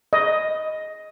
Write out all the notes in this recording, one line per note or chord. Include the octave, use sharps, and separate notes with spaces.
D#5